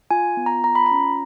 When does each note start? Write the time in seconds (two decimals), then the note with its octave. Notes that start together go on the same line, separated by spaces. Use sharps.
0.11 F4 G#5
0.37 B3
0.46 A#5
0.64 F4 A#5
0.75 B5
0.86 A#5
0.91 C#4